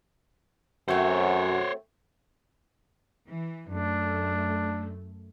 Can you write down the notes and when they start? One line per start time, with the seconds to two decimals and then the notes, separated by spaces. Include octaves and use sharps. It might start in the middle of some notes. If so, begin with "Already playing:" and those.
0.88 F#2 A3 C4 F#4 C5 C#5
3.28 E3
3.69 F#2 A3 D4